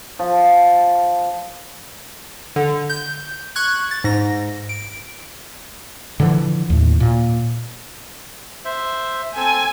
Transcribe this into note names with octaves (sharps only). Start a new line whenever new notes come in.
F3
D3
G6
C#6 F#6 G#6
A6
G#2 A#6
D7
D3 E3 F3
D#2 A2
A#2
C5 E5
C4 A4 G#5 E6